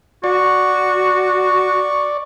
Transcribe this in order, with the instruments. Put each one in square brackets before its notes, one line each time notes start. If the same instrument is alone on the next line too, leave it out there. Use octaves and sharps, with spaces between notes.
[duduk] F#4 [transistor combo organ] D5 [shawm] C#6